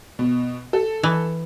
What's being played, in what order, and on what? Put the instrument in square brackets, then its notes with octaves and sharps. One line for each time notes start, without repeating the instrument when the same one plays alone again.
[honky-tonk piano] B2
A4
[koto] E3